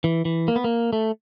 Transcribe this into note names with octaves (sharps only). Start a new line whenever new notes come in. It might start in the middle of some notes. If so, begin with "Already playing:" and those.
E3
E3
A#3
B3
A#3
A3